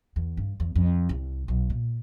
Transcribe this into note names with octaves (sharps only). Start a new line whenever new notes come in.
E2
G2
E2
F2
C2
B1
A#2